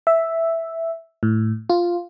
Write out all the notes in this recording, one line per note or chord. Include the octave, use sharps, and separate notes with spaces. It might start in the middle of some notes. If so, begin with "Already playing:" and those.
E5
A2
F4